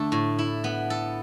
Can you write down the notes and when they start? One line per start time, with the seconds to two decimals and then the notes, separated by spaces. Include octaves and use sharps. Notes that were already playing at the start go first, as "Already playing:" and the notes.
Already playing: D3 A3 D4 A4
0.12 A2
0.39 E4
0.64 B3
0.90 A4